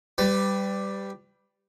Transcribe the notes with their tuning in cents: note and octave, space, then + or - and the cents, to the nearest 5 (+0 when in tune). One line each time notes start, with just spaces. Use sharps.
G3 +0 B4 +35